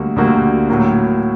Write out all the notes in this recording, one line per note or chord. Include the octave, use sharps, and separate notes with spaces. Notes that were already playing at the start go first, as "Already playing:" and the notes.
Already playing: D2 D3 G3 A#3 F#4
D2 D3 G3 A#3 F#4
A2 F#3 A#3 F#4